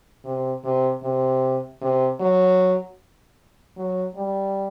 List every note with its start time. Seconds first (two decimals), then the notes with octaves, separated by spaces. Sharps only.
0.24 C3
0.64 C3
1.02 C3
1.81 C3
2.20 F#3
3.77 F#3
4.15 G3